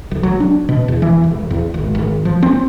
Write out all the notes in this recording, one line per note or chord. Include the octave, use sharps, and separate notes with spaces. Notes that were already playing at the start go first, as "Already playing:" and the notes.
B1
F#3
D4
B2
E2
E3
E1
E2
G#1
G#1
F3
C4